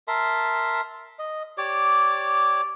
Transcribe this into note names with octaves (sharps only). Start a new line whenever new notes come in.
A#4 E5 A5 C6
D#5
G4 C#5 D5 D6